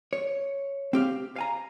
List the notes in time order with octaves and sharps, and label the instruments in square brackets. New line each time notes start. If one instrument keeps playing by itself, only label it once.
[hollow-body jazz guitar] C#5
C4 G4 F5
F5 G#5 A#5